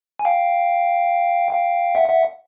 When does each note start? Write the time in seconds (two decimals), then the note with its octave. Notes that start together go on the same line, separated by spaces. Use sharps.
0.19 G#5
0.25 F5 G5
1.52 F5 G5
1.95 E5 F#5
2.09 E5 F#5